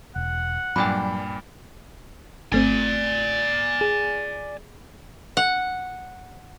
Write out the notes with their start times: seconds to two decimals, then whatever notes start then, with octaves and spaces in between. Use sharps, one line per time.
0.16 E1 F#5
0.76 G2 A#2 F#3 G5 G#5 B5
2.52 G1 A3 C4 D5 G#5
3.81 G#4
5.37 F#5